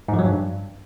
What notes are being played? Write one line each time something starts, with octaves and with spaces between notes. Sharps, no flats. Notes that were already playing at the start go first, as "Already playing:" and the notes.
G#2
F3
F#3
G2